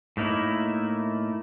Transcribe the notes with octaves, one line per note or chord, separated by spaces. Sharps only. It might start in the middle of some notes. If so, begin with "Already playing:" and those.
A2 A3 A#3 D#4 E4